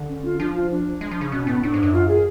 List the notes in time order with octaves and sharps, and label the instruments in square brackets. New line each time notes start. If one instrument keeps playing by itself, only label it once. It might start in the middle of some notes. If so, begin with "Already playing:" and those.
Already playing: [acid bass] D3
[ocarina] C#4
F4
[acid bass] F3 [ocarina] D4
[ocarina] F4
D4
[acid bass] G#3
F3
C#3
[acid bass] B2 [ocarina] C#4
[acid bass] A2 [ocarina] B3
[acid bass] A2 [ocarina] D4
[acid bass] G#2
F#2
[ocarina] F4
G#4